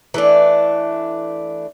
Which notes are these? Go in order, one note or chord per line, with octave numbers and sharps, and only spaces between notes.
E3 A3 D4